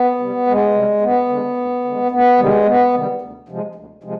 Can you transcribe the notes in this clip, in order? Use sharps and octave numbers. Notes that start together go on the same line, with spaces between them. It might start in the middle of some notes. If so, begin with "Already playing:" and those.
Already playing: B3
C3 G3
D2 G#3
C3 G3
D2 B3
D3 G#3
D2
D3 G#3
D2 B3
C3 D#3 G3 G#3
D2 B3
C3 D#3 G3
D2
C3 F3 G#3
D2
C3 F3 G#3